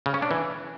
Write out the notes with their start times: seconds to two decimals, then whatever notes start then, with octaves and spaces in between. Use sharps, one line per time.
0.06 C#3
0.14 C#4
0.22 D4
0.31 E3